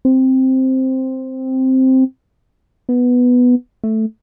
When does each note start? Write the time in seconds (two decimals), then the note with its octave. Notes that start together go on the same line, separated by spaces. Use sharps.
0.05 C4
2.89 B3
3.84 A3